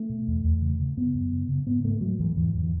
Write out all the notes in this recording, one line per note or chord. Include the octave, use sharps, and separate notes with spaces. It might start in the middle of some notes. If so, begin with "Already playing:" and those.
Already playing: A3
B2
E2
E2
C#3
C#3
F#2 B3
F#2
C#3
C#3
G#2 B3
G#2 A3
G#2 F#3
G#2 E3
E2 E3
E2
E3